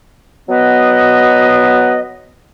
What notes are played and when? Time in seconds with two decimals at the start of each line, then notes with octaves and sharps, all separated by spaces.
0.48 F#3 B3 B4 D#5